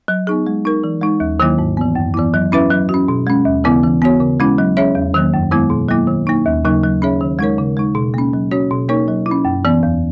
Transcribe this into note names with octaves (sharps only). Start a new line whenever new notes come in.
F#3
B3 D#4 G#4
G#3
D#4 A#4
E3
G#3 D#4
D#2
D#3 F#3 A#3 E4
G#2
E3 B3
F#2
E3 B3 E4
F#3
C#4 E4 B4 E5
F#3
C#4 F#4
B2
G#3 C#4
D#2
C#3 E3 B3 E4
E3
B3 F#4 C#5
C#3
G#3 C#4 E4
F#3
C#4 G#4 C#5 E5
E2
D#3 F#3 A#3
F#2
D#3 G#3 B3 E4
B2
F#3 A#3 E4
D#3
A#3 D#4
D#2
C#3 F#3 A#3 D#4
F#3
C#4 G#4 C#5 E5
D#3
G#3 D#4 A#4 C#5
C#3
G#3 D#4
B2
A#3 C#4
F#3
C#4 F#4 C#5
B2
A#3 D#4 A#4 C#5
F#3
E4
C#4
F#2
E3 B3
E2